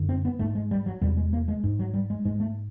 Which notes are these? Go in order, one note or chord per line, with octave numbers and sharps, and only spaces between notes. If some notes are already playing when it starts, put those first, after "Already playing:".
Already playing: F#2 D3
C4
B3
G#2 A3
G#3
G3
F#3
E2 C3 G3
G#3
A#3
G#3
G#2
F#3
G3
G#3
G#2 G#3
A3